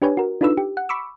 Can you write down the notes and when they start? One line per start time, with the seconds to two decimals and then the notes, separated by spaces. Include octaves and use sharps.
0.02 D4 G4 B4 C#5 G#5
0.17 F#4 A#4
0.41 D4 D#4 F4 A4 B4 E6
0.57 G4
0.77 F#5
0.89 B5 C#6 D6 E6